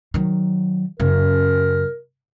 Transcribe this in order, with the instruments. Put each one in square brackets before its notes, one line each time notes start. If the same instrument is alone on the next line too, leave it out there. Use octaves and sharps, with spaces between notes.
[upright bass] D#3 F#3
[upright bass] F#2 C#3 [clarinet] A#4